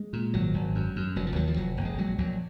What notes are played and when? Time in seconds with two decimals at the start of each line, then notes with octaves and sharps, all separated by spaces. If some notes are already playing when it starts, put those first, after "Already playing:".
Already playing: G#3
0.13 A#2
0.34 G#1 F#3
0.54 G#1
0.75 F#2
0.96 F#2
1.16 F1 F#3
1.27 F3
1.36 D#2 F#3
1.47 F3
1.57 F1 F#3
1.77 F1
1.85 G#3
1.98 A#1 F#3
2.18 A#1 F#3